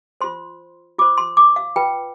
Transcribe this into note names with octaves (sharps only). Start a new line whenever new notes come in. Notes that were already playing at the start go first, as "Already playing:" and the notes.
F4 C5 C6
F4 C5 D6
C6
D6
F5
F4 B4 G5